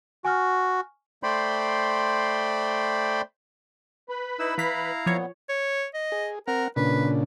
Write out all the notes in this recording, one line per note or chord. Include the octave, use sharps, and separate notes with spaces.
F#4 G#5 C#6 F6
A3 C5 D5 G5 B5 C6
B4 B5
D#4 E4 E6
E3 E4 F5 A#5 B6
A#2 F3 B3 C#5
C#5
D#5
G#4
C4 A#4 F#5
A#2 C#3 D4 B4